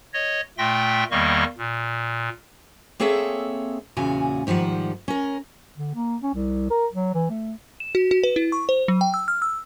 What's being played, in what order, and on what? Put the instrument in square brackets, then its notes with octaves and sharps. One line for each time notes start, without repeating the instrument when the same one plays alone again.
[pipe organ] C#5 D#5
A#2 A3 E5 G5 C6 A#6
E2 D#3 G3 A#3 D#5 C#6
A#2
[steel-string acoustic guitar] A#3 C4 G#4 A4 C#5 E5
E2 A#2 C#3 F#4 G#5
G#2 D#3 F3 G3 F#5
C#4 A#4
[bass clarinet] D3
A#3
C#4
C2
A#4
F#3
E3
A3
[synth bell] E7
F#4
F#4
B4
E4
C#6
C5
F#3
G5
E6
F6
E6